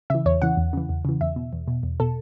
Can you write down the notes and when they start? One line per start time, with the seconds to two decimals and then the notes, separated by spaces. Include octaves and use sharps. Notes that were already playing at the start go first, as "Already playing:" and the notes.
0.10 C#3 E3 E5
0.25 E2 C#5
0.42 C#3 E3 F#5
0.57 E2
0.73 C#3 E3
0.89 E2
1.05 C#3 E3
1.21 E2 E5
1.36 B2
1.53 E2
1.68 B2
1.83 E2
2.00 B2 A4